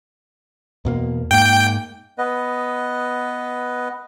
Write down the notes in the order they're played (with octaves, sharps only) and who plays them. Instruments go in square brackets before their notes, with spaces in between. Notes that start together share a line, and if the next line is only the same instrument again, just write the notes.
[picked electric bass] E2 B2 A#3
[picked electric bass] G#2 A#3 [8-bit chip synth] G5
[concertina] B3 B4 D#5